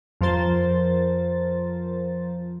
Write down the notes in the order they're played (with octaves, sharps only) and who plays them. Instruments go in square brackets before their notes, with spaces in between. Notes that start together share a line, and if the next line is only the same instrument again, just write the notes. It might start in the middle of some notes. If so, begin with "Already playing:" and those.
[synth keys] F2 F3 A#4 C5 A6